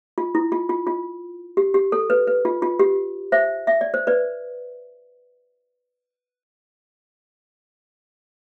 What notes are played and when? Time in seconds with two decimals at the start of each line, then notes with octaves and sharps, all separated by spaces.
0.18 F4
0.35 E4
0.52 F4
0.69 F4
0.87 F4
1.57 G4
1.74 G4
1.92 A4
2.10 B4
2.27 B4
2.45 F4
2.62 F4
2.79 G4
3.32 C5 E5
3.67 E5
3.81 D5
3.94 C5
4.07 B4 D5